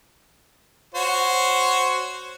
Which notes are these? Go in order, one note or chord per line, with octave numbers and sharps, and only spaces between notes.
F#4 C5 C#5